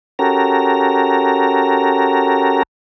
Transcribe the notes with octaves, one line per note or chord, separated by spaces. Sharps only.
C#4 F#4 G4 A4 A#4 A#5